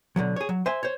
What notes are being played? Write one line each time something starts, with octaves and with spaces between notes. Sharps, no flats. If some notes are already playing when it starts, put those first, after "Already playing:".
B2 D3 F3 F#3
G#4 C#5
F#3
C5 E5 G#5
C5 C#5